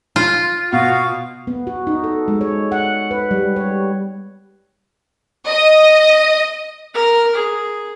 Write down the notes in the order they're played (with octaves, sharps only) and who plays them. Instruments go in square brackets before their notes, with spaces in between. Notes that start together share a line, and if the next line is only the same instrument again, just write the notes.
[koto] F4
[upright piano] B2 [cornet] F#4 [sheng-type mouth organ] F5
[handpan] B3
F#4
D#4
A4
G#3
C#5
F#5
B4
G3
C#5
[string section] D#5
[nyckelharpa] A#4
G#4